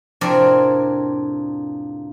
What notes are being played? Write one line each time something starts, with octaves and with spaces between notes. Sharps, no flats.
F2 A2 C3 D4 A#4 D5